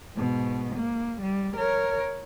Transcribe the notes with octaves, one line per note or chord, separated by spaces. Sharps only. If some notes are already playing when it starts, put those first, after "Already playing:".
G#2 B2
A#3
G3
A#4 C#5